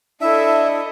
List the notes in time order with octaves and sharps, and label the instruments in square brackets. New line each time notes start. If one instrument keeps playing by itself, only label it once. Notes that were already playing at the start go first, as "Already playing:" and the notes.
[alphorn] D4 [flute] E4 [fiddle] A4 D#5 [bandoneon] E5